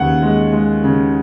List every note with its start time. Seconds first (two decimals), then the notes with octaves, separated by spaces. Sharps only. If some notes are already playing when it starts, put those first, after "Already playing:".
Already playing: D#2 C#3 F#5
0.22 G#3
0.52 G#3
0.84 C#3